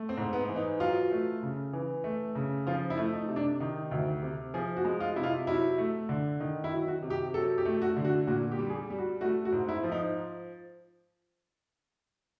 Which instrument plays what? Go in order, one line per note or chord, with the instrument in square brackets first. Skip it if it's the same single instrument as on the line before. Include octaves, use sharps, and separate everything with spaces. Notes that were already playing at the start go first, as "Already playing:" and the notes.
Already playing: [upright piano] A3
C4
G#2
B3
E3
D#4
F#3 F4
A3
C#3
E3
A3
C#3
F3 F4
E4
A3
D#4
C3
D4
D#3 D#4
D2
C3
F3 G#4
F#4
G#3
F4
C3 E4
F4
F#3 E4
A3
D3
D#3 D#4
E4
F#3
F#4
C3
G4
F#3 A4
G4
A3
F#4
D3
F#4
A#2 F#4
G4
G3
G#4
G4
G3
F#4
A3 F#4
F#4
G#2
E4
F3
D#4